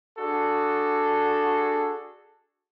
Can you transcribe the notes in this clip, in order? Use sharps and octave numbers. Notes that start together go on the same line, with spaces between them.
D4 F#4 G#4 A4